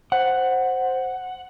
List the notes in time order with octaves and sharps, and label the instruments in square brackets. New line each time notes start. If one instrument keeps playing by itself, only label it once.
[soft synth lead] C5 [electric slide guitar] F#5